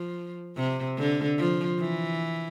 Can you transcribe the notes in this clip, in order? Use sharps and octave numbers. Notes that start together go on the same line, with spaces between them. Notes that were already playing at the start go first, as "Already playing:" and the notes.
Already playing: F3
C3
D3
F3
E3